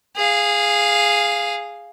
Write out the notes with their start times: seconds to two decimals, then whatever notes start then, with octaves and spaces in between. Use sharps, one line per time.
0.16 G#4 F5